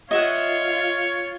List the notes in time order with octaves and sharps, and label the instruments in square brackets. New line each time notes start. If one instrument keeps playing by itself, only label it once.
[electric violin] F4 [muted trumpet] C#5 [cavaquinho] D#5 E5 F#5